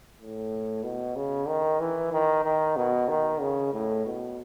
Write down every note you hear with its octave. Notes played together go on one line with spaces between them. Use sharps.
A2
B2
C#3
D#3
E3
D#3
D#3
B2
D#3
C#3
A2
B2